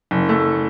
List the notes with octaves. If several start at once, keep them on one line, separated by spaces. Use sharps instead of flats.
F#1
A3